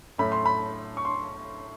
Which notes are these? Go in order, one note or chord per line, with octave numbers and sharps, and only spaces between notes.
A2 F#3 A3 C#4 B5
C6
B5
C#6
C6